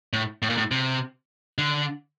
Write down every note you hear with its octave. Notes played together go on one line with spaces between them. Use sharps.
A2
A2
A#2
A2
C3
D3